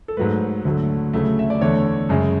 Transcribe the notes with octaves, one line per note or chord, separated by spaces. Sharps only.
A4
G#2 F#3 A3 B4
D2 D3 F#3 A3
D2 C#3 F#3 A3
E5
D5
E2 D3 A3 C#5
F#2 C#3 G#3